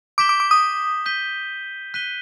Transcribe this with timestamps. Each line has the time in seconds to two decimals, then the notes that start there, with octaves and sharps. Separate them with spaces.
0.18 D6 G6 B6 E7 G7
0.29 D6
0.40 D6
0.51 D#6
1.06 G6 B6 D#7 G7
1.94 F#6 B6 D#7 G7